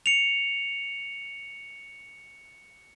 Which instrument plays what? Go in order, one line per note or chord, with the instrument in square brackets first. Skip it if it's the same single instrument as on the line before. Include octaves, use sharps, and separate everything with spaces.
[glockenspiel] C#7 F7